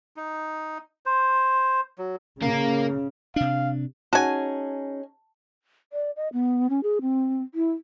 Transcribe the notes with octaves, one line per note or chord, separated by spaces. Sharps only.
D#4
C5
F#3
C#3 A#3 A#4
C3 D4 F5
C#4 D#4 F#4 G#4 G#5 A5
D5
D#5
B3
C#4
G#4
C4
E4